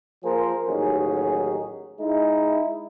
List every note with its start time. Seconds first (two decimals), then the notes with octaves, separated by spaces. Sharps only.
0.24 F3 A#3 G#4 A#4 C5
0.68 A1 D#2 F#3 C#4 D#4 G#4
2.00 G#3 D#4 E4